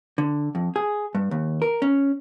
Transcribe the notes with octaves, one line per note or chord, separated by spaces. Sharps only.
D3
F2
G#4
G2
D#2
A#4
C#4